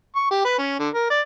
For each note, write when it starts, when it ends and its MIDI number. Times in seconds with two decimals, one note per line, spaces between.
0.16 0.27 85
0.31 0.41 67
0.45 0.56 71
0.59 0.78 61
0.79 0.89 50
0.94 1.10 70
1.10 1.20 74